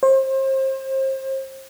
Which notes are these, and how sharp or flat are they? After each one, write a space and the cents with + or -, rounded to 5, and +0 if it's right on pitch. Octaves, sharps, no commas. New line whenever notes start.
C5 +35